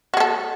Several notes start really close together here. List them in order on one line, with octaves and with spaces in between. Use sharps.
F#4 G#4 A4